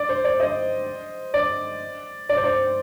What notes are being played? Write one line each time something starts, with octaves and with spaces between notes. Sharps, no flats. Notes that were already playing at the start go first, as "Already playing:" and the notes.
Already playing: D5
C5
D5
C5 D#5
D5
D5
C5
D5